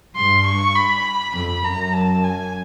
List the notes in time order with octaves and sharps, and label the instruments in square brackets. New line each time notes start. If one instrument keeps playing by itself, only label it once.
[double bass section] G2 [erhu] C6
[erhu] C#6
B5
[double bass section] F2 [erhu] B5
[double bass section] F#2 [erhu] A#5
[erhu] A5
G#5